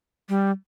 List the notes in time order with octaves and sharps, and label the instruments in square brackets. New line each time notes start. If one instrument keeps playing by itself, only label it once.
[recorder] G3